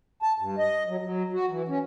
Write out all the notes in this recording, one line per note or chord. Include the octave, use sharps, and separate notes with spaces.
A5
G2
D#5
F#3
F#3
F#4
E3
C#4